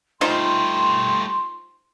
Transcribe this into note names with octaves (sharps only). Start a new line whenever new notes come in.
G3 A3 D#4 F4 C5 C6